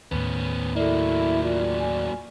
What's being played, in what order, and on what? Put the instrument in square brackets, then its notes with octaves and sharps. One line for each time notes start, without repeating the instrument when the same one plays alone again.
[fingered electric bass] D#2 A2 [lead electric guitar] B3 C#4
[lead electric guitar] F#3 A#3 [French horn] E4 [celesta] A4 D5
[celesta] F4 [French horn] D5
[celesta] G#5